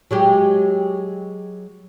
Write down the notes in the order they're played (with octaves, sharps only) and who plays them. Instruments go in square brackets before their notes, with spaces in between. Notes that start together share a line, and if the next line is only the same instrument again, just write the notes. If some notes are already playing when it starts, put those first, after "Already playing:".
[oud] F#3 G#3 G4